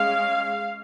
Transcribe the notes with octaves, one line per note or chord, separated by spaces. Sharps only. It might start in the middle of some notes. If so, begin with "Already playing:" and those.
Already playing: G#3 C#4 F5